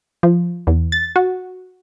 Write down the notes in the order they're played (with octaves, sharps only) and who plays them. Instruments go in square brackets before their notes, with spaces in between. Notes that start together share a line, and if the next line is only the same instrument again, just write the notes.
[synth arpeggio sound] F3
E2
A6
F#4